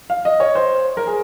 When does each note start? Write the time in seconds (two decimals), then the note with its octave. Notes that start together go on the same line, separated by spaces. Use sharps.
0.10 F5
0.25 D#5
0.40 C#5
0.55 C5
0.97 A#4
1.07 G#4